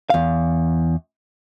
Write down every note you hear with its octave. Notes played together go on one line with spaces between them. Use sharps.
E2 F5